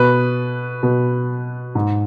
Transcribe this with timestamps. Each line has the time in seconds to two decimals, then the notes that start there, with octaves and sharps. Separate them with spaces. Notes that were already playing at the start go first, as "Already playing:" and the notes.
Already playing: B2 B4
0.83 B2
1.75 G#2